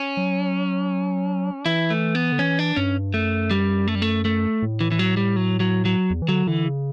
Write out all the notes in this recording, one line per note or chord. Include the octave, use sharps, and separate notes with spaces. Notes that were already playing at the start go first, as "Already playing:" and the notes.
Already playing: C#4
F#3
E3 E4
A3
B3
D3
E3 C#4
D4
G2 C#4
F#2 A3
G3
A3
G3
A3
A3
A2
E3
E3
F#3
G3
F#3
F#3
F#3
E2
E3
D3 F#3
D3 E3
C#3